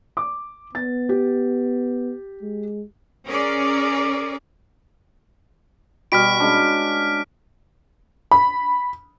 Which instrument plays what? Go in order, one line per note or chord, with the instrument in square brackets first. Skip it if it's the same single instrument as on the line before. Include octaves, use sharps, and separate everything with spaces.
[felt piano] D6
[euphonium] B3 [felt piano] A6
[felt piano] G4
[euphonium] G#3
[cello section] C#4 G#4 A#4 D5
[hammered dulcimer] B2 G3 F#4 [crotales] F6 B6 D7
[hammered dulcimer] G#3 C#4 D4
[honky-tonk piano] B5